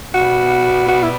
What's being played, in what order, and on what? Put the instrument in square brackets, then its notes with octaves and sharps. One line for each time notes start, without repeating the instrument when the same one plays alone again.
[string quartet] B2 G3 B3 [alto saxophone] F#4
[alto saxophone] F#4
E4